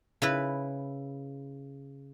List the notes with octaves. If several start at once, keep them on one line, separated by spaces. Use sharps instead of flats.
C#3 E4 B4